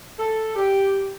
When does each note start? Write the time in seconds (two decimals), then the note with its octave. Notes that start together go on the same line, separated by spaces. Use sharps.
0.18 A4
0.55 G4